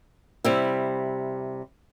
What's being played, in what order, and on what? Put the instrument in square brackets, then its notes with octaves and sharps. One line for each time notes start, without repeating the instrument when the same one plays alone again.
[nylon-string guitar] C3 G3 E4